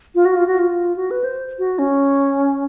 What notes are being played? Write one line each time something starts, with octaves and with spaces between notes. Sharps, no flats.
F4
F#4
F4
F#4
F4
F#4
B4
C5
F#4
C#4